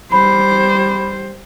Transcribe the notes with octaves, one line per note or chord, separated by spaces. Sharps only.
G3 C5 B5